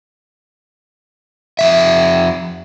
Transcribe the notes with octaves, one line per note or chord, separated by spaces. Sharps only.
F2 F3 E5